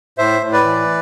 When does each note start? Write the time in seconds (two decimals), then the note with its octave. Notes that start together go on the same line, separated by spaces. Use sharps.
0.18 A2 C5 E5
0.42 A2
0.53 B4 D5
0.64 E3